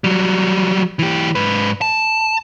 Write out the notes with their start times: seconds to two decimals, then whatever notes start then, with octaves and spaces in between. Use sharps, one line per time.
0.04 F#3 G3
0.99 E3 G4
1.35 G#2 B4
1.81 A5